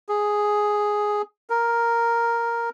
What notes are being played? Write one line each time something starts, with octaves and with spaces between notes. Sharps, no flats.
G#4
A#4